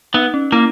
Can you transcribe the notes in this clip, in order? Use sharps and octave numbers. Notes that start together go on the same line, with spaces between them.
B3 D#4
C#4
A#3 E4